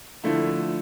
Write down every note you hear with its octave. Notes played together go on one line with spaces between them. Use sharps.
D3 F3 A3 E4